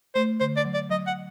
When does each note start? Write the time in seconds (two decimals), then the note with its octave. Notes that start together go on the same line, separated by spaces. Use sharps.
0.15 A3 C5
0.40 D3 C5
0.57 D5
0.65 F#3
0.74 D5
0.90 F#3 D#5
1.07 F#5